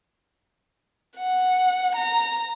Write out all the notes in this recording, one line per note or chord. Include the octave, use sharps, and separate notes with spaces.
F#5
A#5